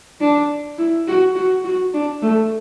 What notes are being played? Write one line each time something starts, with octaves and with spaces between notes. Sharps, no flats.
D4
E4
F#4
F#4
F#4
D4
A3